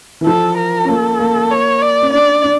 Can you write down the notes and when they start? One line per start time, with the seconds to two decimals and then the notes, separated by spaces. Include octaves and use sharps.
0.21 E3
0.26 F3 A4
0.57 A#4
0.85 C#4
0.88 A#3 A4
1.19 A#3
1.51 C#5
1.82 D5
2.02 C#4
2.13 D4 D5
2.44 D4